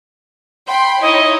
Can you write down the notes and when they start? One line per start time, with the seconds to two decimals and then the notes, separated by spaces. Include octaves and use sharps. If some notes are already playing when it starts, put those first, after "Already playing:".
0.68 G5 B5 C6
1.01 D#4 E4 C#5 D#5